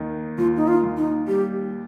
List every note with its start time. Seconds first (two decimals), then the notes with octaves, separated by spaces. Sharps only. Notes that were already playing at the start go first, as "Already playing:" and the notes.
Already playing: D#2 D#3
0.38 D#2 F4
0.56 D#4
0.68 F4
0.83 D#2
0.97 D#4
1.28 G3 G4